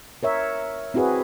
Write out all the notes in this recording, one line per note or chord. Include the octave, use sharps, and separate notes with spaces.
A#4 C#5 E5
C4 E4 F#4 G#4 B4